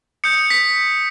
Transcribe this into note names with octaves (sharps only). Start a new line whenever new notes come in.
D#6 G6 C#7
B6